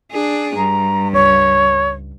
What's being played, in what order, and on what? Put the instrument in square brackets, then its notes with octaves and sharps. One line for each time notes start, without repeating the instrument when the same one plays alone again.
[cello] D4 G#4
[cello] G2 [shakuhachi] A#5
[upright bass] C#2 [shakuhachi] C#5